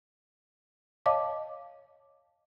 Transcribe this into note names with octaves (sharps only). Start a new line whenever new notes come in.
C#5 D#5 F5 A5 D6